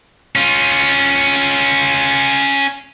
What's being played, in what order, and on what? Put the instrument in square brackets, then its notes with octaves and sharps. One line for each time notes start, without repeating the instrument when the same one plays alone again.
[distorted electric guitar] C#4 F4